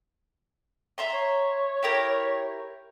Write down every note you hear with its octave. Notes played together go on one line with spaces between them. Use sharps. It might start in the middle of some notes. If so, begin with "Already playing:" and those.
E5 A#5 C6
C#5
E4 G4 A#4